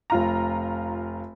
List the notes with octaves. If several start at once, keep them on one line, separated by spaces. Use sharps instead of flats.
F1 F4 A#5